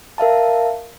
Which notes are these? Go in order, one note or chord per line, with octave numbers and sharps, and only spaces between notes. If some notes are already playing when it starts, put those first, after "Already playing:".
A#4 E5 F5 A5